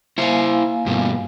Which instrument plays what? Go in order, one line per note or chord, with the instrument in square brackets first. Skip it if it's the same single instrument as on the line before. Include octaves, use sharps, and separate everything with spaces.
[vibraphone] A#3 F5 G#5 [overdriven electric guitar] E4 C5
[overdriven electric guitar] G2 B2